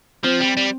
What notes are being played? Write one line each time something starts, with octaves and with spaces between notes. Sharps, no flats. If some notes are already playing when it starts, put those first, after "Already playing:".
F3 C4
G3
G3